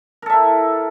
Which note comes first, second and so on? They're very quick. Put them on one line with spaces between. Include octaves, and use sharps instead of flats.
A#4 A4 E5 E4